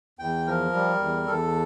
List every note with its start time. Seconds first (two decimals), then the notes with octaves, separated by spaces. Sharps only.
0.19 E2 G5
0.46 F3 A#4
0.73 G3
1.00 E2
1.26 E2 A4